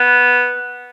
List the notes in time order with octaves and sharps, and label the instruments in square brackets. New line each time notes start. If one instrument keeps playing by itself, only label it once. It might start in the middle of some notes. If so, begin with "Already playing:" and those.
Already playing: [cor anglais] B3